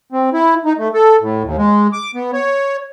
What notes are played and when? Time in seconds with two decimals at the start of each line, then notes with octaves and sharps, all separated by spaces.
0.12 C4
0.33 E4
0.65 D#4
0.78 A3
0.94 A4
1.21 A2
1.44 D#2
1.57 G#3
1.93 D6
2.15 B3
2.33 C#5